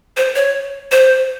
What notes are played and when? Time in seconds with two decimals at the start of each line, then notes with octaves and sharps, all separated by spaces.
0.17 C5
0.36 C#5
0.92 C5